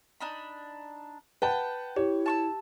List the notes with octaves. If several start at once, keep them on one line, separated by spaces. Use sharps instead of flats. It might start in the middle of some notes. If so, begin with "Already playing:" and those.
D4 D#4 B5
B4 F#5 G5 A5
E4 G4 C#5
A5 C#6 E6